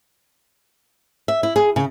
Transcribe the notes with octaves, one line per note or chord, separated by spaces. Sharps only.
E5
E4
G#4
C#3